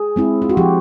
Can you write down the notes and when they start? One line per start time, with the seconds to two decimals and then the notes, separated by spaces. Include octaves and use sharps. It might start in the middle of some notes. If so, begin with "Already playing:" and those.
Already playing: G#4
0.16 G#3 C4 E4
0.42 F4
0.49 F#4
0.57 F3 G4